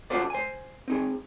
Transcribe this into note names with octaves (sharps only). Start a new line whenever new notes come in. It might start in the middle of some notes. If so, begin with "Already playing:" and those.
C#4 F4 F#4 A4 C5 D5
C5 G#5
C4 D#4 G#4